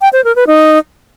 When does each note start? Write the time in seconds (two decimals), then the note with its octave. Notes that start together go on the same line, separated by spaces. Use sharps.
0.01 G5
0.13 C5
0.24 A#4
0.36 B4
0.47 D#4